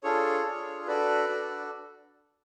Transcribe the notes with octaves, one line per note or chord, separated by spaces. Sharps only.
D4 F4 G#4 A4 C#5
D4 F4 G#4
D4 F#4 A4 B4 D5
D4 F#4 A4